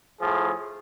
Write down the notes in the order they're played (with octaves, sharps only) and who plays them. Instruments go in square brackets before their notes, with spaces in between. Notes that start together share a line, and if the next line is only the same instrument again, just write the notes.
[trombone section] A2 F3 G#4